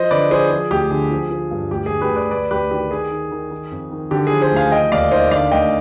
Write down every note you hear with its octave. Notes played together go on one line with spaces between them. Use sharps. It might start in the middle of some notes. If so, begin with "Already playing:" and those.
Already playing: F3 C5 D#5
D3 B4 D5
F3 G#4 C5
F3 G#4
D2 G4
D3 G#4
F3
F3
G2
D2 G4
D2 G#4
G4 B4
D2
B4 D5
D2 B4 D5
D2 G4 B4
D#3 G4
D#3 G#4
D#3
D#3
D#3
F2
D#3
D3 G4
G#4
F3
G#4 C5
D2 F5 G#5
D#3 D#5 G5
D#2 D5 F5
D#3 C5 D#5
D3 D5 F5
D2 D#5 G5